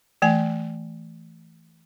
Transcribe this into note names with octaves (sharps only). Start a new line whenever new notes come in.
E3 A3 G#5